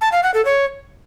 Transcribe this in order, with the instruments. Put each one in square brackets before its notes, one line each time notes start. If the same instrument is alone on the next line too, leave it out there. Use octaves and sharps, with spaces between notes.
[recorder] A5
F5
F#5
A4
C#5